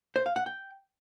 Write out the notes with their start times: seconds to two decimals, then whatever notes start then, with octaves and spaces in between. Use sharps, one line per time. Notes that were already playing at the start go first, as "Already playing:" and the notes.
0.16 C5
0.26 F5
0.36 F#5
0.46 G5